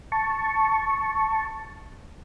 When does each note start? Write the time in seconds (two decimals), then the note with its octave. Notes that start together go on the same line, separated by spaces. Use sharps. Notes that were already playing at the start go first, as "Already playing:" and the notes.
0.12 A5 C#6